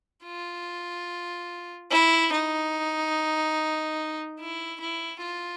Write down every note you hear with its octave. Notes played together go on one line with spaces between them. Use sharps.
F4
E4
D#4
E4
E4
F4